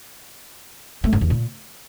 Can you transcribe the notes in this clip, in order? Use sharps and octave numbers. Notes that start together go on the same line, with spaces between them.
A3
F#2
E2
A#2